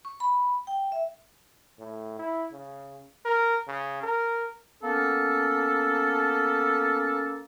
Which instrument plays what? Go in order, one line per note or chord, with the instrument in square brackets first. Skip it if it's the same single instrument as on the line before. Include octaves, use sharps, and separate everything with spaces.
[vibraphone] C#6
B5
G5
E5
[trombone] A2
E4
C#3
A#4
C#3
A#4
[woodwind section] A#3 B3 C#4 A4